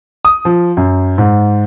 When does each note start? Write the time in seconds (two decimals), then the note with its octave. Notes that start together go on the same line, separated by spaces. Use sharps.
0.25 D#6
0.45 F3
0.77 F#2
1.18 G#2